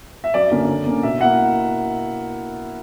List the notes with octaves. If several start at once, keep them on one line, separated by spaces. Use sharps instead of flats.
E5
F#2 D5
D3 A#3 C#4
D3
A#3 C#4
B2 E5
A#3 E4 F#5